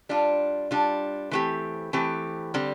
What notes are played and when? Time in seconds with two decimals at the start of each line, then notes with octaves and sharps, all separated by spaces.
0.09 G3 D4 F4
0.71 G3 D4 F4
1.31 E3 A3 C4 G4
1.93 E3 A3 C4 G4
2.54 D3 G3 C4